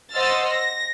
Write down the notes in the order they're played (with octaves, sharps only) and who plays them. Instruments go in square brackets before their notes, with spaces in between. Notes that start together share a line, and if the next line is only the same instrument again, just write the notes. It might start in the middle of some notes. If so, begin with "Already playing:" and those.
[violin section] C5 D#5 F#5 E6 F6 A6
A#6